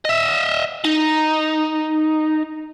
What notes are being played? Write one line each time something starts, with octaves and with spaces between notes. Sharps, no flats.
D#5 E5
D#4